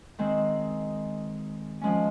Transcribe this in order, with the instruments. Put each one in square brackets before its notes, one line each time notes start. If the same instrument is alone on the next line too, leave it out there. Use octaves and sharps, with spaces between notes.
[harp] D#3 G#3 C4
F3 G#3 C#4